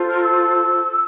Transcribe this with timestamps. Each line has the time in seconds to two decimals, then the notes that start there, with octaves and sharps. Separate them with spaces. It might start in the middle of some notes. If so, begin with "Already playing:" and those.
Already playing: F4 A4 C5
0.08 F6
0.23 E6